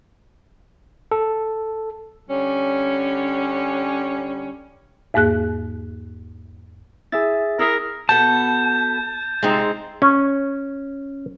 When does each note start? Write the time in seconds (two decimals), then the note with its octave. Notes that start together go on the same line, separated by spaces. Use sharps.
1.12 A4
2.29 D3 G3 C#4
5.14 E2 G#2 A#3 G#4 F#6
7.12 E4 G#4 E5 A6
7.59 E4 G#4 A#4 E5
8.09 B2 B3 A4 A5 G6
9.43 C3 G#3 C4 D#4 F4
10.02 C#4